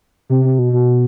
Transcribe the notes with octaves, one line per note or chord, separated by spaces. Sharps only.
C3
C3
B2
B2